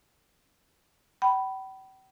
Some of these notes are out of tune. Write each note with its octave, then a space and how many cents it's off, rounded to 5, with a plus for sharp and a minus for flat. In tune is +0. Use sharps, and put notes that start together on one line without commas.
G5 -40 B5 +0